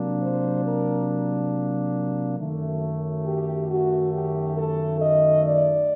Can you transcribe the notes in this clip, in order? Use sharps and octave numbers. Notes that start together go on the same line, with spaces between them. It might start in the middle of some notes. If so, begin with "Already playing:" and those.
Already playing: C3 F#3 A#3 D4
C5
A#4
F#2 D#3 A3
G4
F#4
G4
A4
D#5
D5